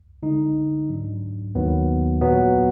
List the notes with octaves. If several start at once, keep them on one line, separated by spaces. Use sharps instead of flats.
D3 G#3 D#4
G#2 F#3 D4
D#2 D#3 F#3 B3
A#2 F#3 B3